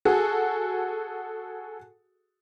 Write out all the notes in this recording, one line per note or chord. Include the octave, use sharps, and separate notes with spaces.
F#4 G#4 A4